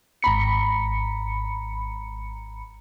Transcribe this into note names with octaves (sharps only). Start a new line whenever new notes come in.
G#1 A#5 B5 C#7